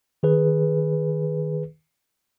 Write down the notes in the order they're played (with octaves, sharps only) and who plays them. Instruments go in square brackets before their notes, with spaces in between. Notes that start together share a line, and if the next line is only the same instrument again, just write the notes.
[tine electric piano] D#3 G#4 B4